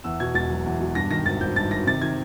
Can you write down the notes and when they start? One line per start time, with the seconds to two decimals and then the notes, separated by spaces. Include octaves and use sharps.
0.04 E2 E6
0.20 B2 G#6
0.34 E1 A6
0.51 F#3
0.66 E2
0.80 B2
0.95 G2 A#6
1.10 D#3 A#6
1.26 G#1 A6
1.41 G#1 G6
1.56 G2 A6
1.71 D#3 A#6
1.86 C3 A6
2.01 D#3 G#6